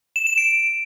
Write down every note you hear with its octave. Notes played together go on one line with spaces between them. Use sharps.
E7
E7
D7